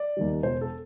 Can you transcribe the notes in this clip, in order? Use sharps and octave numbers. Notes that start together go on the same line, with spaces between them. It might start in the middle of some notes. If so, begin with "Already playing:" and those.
Already playing: D5
D#2 D#3 G3
E1 C5
A4